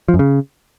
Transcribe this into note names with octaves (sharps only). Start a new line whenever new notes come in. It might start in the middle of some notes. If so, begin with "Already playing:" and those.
F3
F#2
C#3